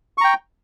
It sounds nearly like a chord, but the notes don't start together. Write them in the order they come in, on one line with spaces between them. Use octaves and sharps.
C#6 A#5 G5